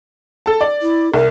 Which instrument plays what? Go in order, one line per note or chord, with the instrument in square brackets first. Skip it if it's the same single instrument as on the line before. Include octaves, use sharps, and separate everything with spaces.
[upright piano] A4 A5
D5
[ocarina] E4
[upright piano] C2 [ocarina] A#4